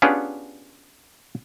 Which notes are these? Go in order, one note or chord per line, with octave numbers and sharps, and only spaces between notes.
B3 C#4 D4 F4 G4 G#4